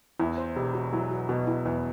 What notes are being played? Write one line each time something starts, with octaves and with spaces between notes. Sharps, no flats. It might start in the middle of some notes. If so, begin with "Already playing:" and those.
E2 E4
C5
E1 G4
F#4
F#3 E4
F#4
B2 F#4
E4
E2 E4